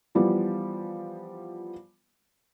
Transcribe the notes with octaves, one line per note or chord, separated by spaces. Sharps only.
E3 F3 G3 B3